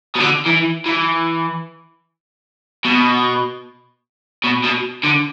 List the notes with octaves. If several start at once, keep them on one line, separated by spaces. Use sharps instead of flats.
B2
D3
E3
E3
B2
B2
B2
D3